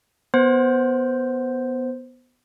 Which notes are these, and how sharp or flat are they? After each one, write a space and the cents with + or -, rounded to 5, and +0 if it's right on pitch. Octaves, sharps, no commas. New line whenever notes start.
B3 +0 C5 +0